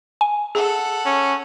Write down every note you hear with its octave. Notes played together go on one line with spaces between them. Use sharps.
G#5
G#4 A4 F#5
C#4